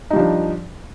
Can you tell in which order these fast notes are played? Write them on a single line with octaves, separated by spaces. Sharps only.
D#4 G3 F3 D4